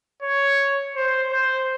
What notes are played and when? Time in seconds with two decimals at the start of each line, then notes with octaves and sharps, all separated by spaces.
0.22 C#5
0.96 C5
1.32 C5